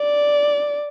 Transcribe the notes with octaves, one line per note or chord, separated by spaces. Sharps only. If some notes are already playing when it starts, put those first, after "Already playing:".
Already playing: D5